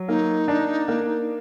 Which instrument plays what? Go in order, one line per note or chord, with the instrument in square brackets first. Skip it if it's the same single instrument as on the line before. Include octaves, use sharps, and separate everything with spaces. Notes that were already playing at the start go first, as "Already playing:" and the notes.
Already playing: [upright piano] F#3
[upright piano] A#3 [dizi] D#4
[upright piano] D4
A#3